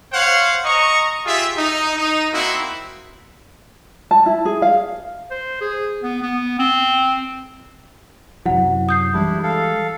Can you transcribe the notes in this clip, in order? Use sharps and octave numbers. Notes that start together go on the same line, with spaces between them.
C5 C#5 F5 F#5
D#5 A#5 C#6
F4 G4 G#4 E5
D#4
D#4
A#3 C4 E4 F#4
A5
E4
G#4
F5
C5
G#4
B3
B3
C4
F#2 C3 F#3 E4 F#5
D#6 G6 C7
E3 G3 G#3 D4 E4
A4 F5